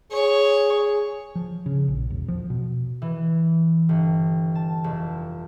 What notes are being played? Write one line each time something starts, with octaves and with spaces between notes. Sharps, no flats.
G#4 C#5
F3
C#3
A#1
E1
F3
B2
E3
G1
A5
F1